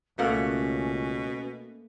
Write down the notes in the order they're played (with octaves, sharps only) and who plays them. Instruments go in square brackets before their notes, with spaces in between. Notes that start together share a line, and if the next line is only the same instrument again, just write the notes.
[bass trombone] C#2 [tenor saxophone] B2 [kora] A3 A#3 F#5 [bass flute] C#4